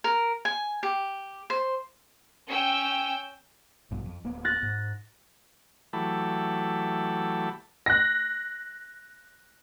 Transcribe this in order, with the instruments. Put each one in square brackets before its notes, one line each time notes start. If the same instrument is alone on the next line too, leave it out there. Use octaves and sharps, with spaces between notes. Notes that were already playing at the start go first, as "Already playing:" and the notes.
[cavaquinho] A#4
G#5
G4
C5
[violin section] C#4 G5 E6
[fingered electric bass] A#1 G2 B2
F2
D1 A#3 B3
[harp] F#6 A6 A#6
[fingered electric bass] G#2
[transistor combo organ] E3 F#3 A3 G4 A5 B5
[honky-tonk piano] F#6 A#6